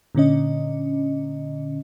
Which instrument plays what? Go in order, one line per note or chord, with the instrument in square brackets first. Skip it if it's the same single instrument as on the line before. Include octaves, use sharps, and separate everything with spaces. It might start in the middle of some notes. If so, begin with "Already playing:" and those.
[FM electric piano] A#2 D3 C#4 D#5